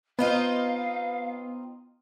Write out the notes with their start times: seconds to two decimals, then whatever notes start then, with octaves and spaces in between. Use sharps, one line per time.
0.19 B3 C4 D#4 F4 F5